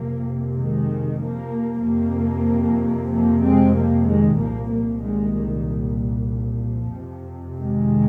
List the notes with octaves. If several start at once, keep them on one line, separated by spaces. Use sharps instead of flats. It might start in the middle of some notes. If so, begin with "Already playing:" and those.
Already playing: F2 C3 F3 A#3
D#3 G#3
F3 A#3
F2 C3 F3 A#3
F3 A#3
G#3 C4
F3 A#3
D#3 G#3
C2 A#2 F3 A#3
F3 A#3
D#3 G#3
D#3
F3
F2 C3
D#3 G#3